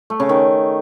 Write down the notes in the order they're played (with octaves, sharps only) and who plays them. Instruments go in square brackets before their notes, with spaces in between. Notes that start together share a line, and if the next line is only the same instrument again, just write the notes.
[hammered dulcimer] A3
C#3
D#3